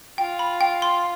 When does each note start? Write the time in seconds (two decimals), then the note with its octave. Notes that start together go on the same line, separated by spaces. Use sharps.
0.18 F4 G5
0.39 B5
0.61 G5
0.82 C6